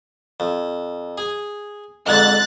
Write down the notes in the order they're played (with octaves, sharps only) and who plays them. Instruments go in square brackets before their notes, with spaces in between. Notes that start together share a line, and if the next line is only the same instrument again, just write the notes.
[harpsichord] F2
G#4 G#5
[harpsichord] F2 G#2 D3 [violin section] F#6 A6